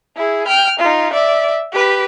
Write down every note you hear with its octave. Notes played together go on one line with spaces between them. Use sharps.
E4 G#4
G5 F6
D#4 F4
D5 E5
G4 B4